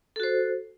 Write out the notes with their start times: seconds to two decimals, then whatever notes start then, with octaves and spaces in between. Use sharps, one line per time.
0.16 A4
0.20 F#4
0.23 C5